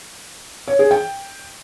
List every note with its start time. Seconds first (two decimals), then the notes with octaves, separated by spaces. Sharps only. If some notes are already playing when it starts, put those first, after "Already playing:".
0.68 C#5
0.79 G#4
0.91 G5